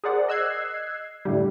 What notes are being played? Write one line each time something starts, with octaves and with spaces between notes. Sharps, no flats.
G#4 A#4 C5 D5 F#5
D#5 E6 F#6 G#6 C7
A2 D3 G3